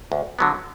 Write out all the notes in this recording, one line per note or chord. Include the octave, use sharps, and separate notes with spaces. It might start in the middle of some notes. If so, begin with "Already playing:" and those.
D2
D3 F#3 B3